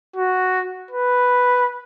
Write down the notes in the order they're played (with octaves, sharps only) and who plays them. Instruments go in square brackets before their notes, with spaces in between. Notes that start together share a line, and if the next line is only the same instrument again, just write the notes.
[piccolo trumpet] F#4
B4